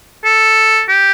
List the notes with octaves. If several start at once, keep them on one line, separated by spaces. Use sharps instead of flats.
A4
G4